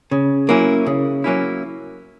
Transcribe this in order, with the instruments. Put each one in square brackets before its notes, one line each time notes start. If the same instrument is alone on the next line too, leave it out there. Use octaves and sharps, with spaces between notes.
[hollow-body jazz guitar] C#3
F#3 A#3 C#4 E4
C#3
F#3 A#3 C#4 E4